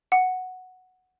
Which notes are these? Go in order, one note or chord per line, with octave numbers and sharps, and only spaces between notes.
F#5